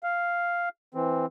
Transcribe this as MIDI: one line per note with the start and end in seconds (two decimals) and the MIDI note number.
0.03 0.69 77
0.94 1.26 52
0.94 1.26 60